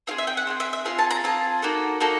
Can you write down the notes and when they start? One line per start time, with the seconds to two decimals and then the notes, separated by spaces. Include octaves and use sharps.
0.07 C4 F4 G#4 F5
0.18 E5
0.27 G5
0.37 F#5
0.47 C4 F4 G#4
0.60 E5
0.73 E5
0.85 C4 F4 G#4 F5
0.98 A5
1.11 A#5
1.24 C4 F4 G#4 A5
1.62 A#3 D#4 F#4 A4
2.00 A#3 D#4 F#4 A4